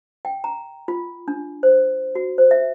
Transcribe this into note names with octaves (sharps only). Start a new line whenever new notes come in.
G5
A#5
F4
D4
C5
F#4
C5
E5